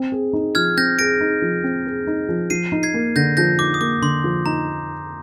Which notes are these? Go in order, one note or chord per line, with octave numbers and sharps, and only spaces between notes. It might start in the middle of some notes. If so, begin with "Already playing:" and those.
Already playing: C4
G#4
D#4
F3 F6 G#6
C4 G6 A#6
G#4 A#6 D7
D#4
F3
C4
G#4
D#4
F3
F3 C7 D#7
D#4
G#6 C7
A#3
D3 G6 A#6
F3 G6 A#6
D#4 D6
D#6
A#3 D6
D3 C6
F3
D#4 A#5